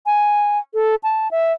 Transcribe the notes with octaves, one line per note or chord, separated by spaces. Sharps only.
G#5
A4
A5
E5